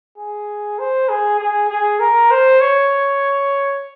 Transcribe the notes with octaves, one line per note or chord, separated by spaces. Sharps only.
G#4
C5
G#4
G#4
G#4
A#4
C5
C#5